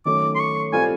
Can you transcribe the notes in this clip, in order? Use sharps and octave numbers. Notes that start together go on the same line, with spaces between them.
D#3 F#3 A3 C#4 D6
C6
C#6
G3 C4 F4 A4 C5 G#5